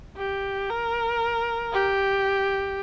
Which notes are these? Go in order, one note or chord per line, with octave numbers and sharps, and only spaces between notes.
G4
A#4
G4